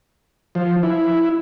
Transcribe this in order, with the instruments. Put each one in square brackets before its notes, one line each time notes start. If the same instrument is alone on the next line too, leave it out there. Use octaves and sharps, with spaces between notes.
[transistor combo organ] F3
E4